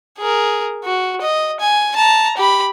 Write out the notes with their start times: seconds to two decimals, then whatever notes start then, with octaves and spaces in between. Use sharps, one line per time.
0.18 G#4 A#4
0.84 F#4
1.21 D#5
1.60 G#5
1.96 A5 A#5
2.37 G4 B5